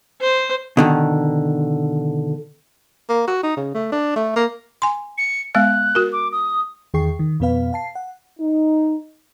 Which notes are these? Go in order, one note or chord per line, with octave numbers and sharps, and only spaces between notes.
C5
B2 D3 D#3
A#3
F#4
D#4
C#3
A3
D4
A3
A#3
G#5 C6
C#7
G#3 B3 F5 F#6
F#4 A#4
D6
D#6
E2 D#3 G#4 G5 C#6 C7
D#3
F2 B2 B3 B4 F5
F5 A5 C7
F#5
D#4